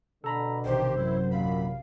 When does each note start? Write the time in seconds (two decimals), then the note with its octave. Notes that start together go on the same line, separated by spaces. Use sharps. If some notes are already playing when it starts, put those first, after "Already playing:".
0.24 B2 D3 A4 A#5 B5
0.65 A1 C3 D#3 G4 C5
0.95 F#2 E4
1.31 D#2 A#2 F5 B5